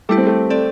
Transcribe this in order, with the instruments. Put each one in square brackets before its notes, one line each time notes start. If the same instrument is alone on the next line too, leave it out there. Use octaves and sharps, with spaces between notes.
[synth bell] G3 E4 G4 [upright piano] A3
[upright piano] C4
A3
[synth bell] C4 A4 D5